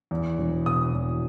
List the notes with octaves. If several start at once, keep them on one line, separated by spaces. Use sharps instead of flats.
E2
E1
B2 D#6
E2